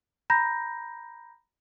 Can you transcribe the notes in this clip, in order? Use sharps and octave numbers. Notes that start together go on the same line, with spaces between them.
A#5 B5 G6 A#6